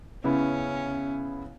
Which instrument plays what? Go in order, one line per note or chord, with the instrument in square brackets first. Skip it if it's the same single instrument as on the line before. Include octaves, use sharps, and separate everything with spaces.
[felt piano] C#3 B3 E4 [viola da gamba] C#4